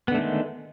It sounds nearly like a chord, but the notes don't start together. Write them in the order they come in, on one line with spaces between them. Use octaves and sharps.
B3 D3 A3 D#3 G#3